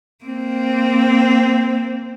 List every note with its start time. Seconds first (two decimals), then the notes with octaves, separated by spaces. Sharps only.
0.25 A#3 C4